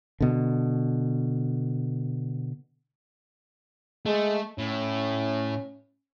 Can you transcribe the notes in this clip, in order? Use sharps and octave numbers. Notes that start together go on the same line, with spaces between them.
B2 D3
G#3 A3
A2 C#4